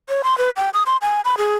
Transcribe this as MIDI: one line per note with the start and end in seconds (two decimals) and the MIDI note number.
0.09 0.22 73
0.24 0.37 84
0.38 0.50 71
0.57 0.70 79
0.74 0.83 87
0.86 0.97 84
1.02 1.21 80
1.25 1.36 83
1.38 1.56 68